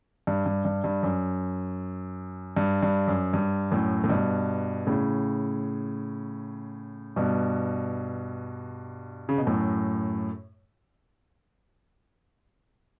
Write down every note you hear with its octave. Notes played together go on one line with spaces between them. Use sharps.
G2
G2
G2
G2
F#2
G2
G2
F#2
G2
F#2 A2
A2
G2 B2
A2 C#3
G2 B2
C#3
B2
F#2 A2